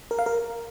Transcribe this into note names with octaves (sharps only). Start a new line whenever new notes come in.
A#4
F5
A#4